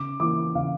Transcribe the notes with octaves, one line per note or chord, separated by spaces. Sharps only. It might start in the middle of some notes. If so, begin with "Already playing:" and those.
Already playing: C#3 D6
E3 A#3 E4 D6
C#3 F5